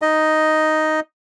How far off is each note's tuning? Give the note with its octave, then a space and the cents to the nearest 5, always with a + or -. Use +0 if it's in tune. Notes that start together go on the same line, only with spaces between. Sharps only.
D#4 +0 D#5 +0